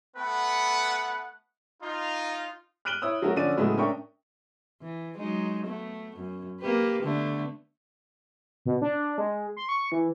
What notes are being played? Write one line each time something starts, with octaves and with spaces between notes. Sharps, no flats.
A3 B3 B4 F#5
D#4 F4
F6 F#6 D7 D#7 F#7 G7
E4 C#5 D#6 E6
F#3 A3 C#4 F#4 A#4
D3 F3 C#4 D5 D#7
A2 C#3 F#3 G#3 A3 B3
C#4 D4 A#4 E5 G5 C#6
E3
F#3 G#3 D#4
A3 B3
F#2
A#3 G4 B4
D3 A3 B3
B2
D4
G#3
C6
C#6
E3